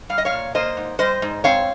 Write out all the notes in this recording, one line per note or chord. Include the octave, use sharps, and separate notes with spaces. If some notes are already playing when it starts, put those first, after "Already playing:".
G3 F5
D#5
C#5 F5
A#2
A#3 C5 D#5
G#2
G3 C5 D#5
G#2
C4 C#5 F5